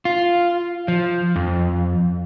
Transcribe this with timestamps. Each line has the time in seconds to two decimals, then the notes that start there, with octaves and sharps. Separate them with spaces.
0.05 F4
0.88 F3
1.36 F2